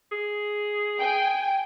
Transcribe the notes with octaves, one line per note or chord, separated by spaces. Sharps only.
G#4
G5 G#5